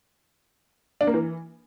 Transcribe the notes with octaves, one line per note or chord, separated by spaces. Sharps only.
D4
A#3
E3